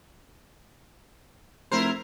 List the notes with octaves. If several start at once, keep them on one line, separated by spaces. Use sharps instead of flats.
F1 E4 A#4 C5